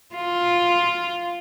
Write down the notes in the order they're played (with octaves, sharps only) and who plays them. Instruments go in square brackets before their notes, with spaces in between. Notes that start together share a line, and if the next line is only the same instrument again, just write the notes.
[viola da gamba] F4